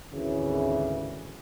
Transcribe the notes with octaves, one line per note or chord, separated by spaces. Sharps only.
G#1 D2 C#3 E3